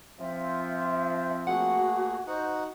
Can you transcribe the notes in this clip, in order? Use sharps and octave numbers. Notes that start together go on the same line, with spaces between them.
F3 C4 F4 E5
A3 A#3 F#4 G#4 F#5
D#4 F#4 C5 F#5